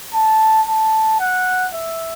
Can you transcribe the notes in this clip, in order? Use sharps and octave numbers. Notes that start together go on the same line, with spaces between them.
A5
A5
F#5
E5